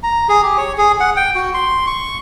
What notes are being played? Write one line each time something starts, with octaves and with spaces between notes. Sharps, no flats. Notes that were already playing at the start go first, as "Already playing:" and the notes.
A#5
G#4
G4
C#5
G#4
F#5
G5
F#4
C6
C#6